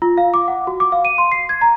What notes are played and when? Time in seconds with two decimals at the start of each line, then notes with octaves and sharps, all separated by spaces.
0.02 F4
0.17 F5
0.34 D6
0.48 F#5
0.67 F#4
0.80 D6
0.92 F5
1.05 D#7
1.18 C6
1.32 C7
1.49 G#6
1.61 A#5